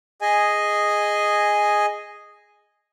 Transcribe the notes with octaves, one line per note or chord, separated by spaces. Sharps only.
G#4 D#5 G#5